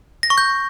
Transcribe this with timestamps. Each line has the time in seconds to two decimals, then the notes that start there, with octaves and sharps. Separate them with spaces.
0.23 A#6
0.30 C#6
0.38 G6